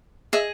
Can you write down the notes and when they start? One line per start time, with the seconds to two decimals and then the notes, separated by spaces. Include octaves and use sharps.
0.33 G#4 D#5 E5